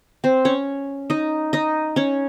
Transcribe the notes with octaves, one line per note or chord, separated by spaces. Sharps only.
C4 C5
C#4 C#5
D#4 D#5
D#4 D#5
C#4 C#5